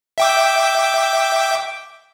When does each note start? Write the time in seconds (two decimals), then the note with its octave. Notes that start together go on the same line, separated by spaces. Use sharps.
0.18 E5 G5 D6